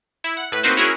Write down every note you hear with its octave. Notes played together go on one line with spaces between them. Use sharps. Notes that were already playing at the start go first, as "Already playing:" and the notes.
E4
F#5
A2 B4
A#3 C4 D#4 F#4 B4 C5
C#4 E4 F#4 G#4 A#4